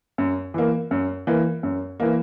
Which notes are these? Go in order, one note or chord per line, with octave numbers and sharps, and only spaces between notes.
F#2
E3 A#3
F#2
E3 A#3
F#2
E3 A#3